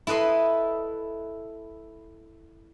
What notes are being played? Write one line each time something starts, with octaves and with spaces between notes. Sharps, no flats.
E4 A4 B4 D#5 C6